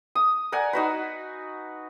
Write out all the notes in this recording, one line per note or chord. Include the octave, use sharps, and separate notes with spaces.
D#6
A#4 D5 F#5 G#5
D#4 F#4 B4